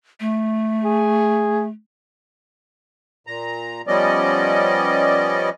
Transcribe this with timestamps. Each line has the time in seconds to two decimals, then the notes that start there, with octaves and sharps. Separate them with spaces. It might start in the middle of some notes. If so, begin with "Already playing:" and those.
0.20 A3
0.84 G#4
3.27 A#2 A#5
3.87 F3 G3 B3 C#4 D5 D#5